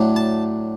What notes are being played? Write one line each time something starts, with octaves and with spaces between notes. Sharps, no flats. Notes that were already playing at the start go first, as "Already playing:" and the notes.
Already playing: A2 F#3 A3 D4
A5